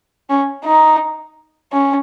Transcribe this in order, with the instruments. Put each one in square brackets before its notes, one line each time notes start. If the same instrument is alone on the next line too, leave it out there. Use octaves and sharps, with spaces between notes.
[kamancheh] C#4
D#4
C#4